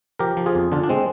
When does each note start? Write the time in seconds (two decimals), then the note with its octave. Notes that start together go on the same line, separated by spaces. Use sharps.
0.19 F3 G4 A#4
0.37 F3
0.46 F4 G#4
0.55 F2
0.72 D3 D4 F4
0.84 D4
0.89 G#3 C4